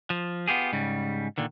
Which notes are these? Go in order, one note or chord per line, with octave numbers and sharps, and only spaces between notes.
F3
B3 F4 G4 G#4
G#2 C#3 G3
A#2 D3 D#3